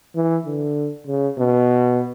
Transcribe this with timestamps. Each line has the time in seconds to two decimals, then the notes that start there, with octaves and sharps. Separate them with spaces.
0.16 E3
0.46 D3
1.07 C#3
1.38 B2